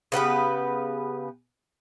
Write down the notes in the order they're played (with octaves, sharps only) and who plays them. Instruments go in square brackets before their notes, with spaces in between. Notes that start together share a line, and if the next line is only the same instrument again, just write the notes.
[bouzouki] C#3 B3 G4 B4